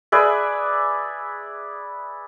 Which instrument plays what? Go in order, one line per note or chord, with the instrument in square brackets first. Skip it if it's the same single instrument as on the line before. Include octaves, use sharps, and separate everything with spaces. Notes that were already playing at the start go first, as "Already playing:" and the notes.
[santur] G#4 B4 D5 E5